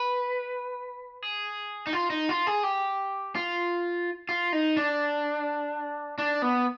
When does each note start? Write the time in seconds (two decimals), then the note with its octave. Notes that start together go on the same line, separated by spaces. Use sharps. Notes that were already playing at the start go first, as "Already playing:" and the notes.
Already playing: B4
1.22 G#4
1.87 D#4
1.93 F4
2.10 D#4
2.29 F4
2.47 G#4
2.63 G4
3.35 F4
4.29 F4
4.53 D#4
4.77 D4
6.18 D4
6.42 B3